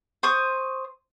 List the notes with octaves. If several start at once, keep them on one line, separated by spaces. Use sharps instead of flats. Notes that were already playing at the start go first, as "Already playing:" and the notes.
C5 C#6 D#6